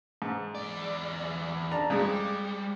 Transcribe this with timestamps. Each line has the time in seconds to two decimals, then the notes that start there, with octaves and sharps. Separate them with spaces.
0.22 G#2
0.55 E2 D5
1.71 D4 A5 A#5
1.90 F2 G3 G#3